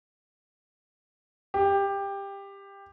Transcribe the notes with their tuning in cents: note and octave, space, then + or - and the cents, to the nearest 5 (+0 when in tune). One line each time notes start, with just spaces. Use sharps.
G4 +15